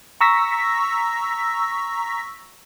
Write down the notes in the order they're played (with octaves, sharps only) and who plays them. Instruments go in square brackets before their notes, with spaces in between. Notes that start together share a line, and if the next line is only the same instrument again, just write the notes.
[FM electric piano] A#5 C#6 E6 A#6 B6